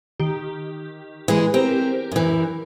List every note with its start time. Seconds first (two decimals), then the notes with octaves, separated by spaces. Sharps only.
0.20 D#3 G4
1.28 E3 G#3 G#4
1.54 C4 G4 A#4
2.12 F#2 E3